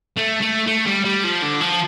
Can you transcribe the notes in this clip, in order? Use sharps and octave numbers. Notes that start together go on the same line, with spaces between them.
A3
A3
A3
G3
G3
F3
D3
F3